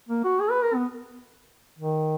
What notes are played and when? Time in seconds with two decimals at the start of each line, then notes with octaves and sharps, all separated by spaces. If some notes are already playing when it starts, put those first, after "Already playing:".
0.09 A#3
0.24 F#4
0.40 G#4
0.51 B4
0.62 A#4
0.75 B3
1.79 D#3